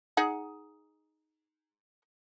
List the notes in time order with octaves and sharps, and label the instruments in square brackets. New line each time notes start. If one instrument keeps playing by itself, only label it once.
[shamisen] D#4 G#4 F#5